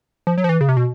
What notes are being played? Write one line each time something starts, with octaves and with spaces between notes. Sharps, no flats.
F3
F#3
F3
E3
C#3
C3
B2